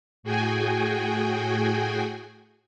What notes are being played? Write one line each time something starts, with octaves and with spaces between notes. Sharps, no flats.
A2 F#4 G#4 G5 G#5